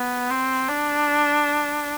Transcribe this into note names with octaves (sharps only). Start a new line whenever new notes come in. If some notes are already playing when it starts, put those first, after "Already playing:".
Already playing: B3
C4
D4